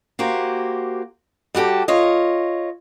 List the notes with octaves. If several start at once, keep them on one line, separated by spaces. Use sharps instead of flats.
A#3 F#4 G4 C5
G3 F#4 G4 A4
F4 C#5 D#5